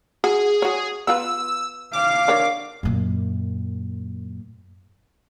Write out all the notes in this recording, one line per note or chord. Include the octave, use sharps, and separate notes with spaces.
F#4 G#4
F#4 C#5
B3 F4 B4 E6
F5 D6
D4 A#4 C#5
F#2 A#2